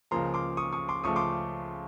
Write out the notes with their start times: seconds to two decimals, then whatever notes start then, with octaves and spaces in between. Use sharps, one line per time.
0.11 C#2 C#3 F3 A#3 A#5 C6
0.34 C6 D6
0.57 C#6 D#6
0.73 C#6 D#6
0.88 C6 D6
1.04 C#2 C#3 F3 A3 C#6 D#6
1.16 C6 D6